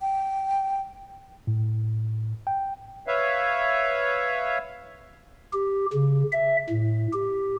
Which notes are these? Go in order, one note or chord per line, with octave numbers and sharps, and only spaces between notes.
G5
A2
G5
B4 C#5 E5 F5
G4
C#3
E5
A2
G4